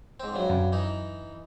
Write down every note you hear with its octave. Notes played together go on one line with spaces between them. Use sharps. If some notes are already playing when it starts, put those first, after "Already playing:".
G#2 C4
G2 F#3
F#2
E3 D#4